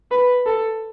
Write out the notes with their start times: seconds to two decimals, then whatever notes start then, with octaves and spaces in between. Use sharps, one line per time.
0.11 B4
0.46 A4